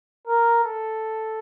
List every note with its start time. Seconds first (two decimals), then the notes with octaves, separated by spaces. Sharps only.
0.27 A#4
0.64 A4